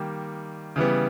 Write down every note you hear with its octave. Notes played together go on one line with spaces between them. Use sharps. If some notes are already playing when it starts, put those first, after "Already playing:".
Already playing: D#3 G3 A#3
C#3 E3 G3 B3